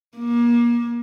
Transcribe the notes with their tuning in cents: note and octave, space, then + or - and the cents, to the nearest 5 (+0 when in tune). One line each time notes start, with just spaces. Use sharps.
A#3 +30